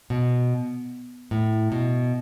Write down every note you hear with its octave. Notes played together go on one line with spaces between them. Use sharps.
B2
A2
B2